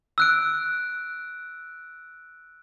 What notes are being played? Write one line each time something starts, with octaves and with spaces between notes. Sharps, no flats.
E6 F#6 D7